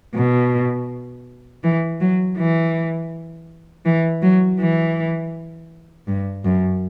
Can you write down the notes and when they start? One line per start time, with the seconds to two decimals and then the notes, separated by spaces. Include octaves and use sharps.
0.15 B2
1.63 E3
2.00 F#3
2.37 E3
3.85 E3
4.22 F#3
4.59 E3
6.07 G2
6.44 F#2